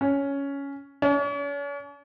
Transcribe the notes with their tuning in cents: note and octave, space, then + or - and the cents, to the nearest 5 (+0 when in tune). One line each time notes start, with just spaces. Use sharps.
C#4 +10
C#4 +45